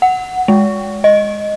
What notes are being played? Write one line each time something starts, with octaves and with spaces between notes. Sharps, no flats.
F#5
G#3
D#5